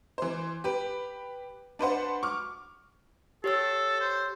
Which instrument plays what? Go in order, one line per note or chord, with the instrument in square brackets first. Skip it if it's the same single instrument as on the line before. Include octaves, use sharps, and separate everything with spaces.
[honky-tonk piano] E3 C5
G4 B4
D4 B4 C5 F#5
C#6 D6 F6
[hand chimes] G4 C#5 E6 [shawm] A4
[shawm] C5